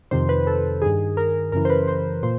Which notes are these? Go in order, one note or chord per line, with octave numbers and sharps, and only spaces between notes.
F2 C3 D#3 C5
B4
A4
G2 D#3 G#4
A#4
F#2 C#3 E3 A#4
C5
B4
C5
A#2 C5